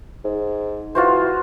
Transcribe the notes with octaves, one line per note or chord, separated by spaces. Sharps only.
G#2
E3 F4 F#4 C5